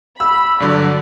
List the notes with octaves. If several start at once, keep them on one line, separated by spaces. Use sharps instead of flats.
B5 E6
G2 D3 F#3 D5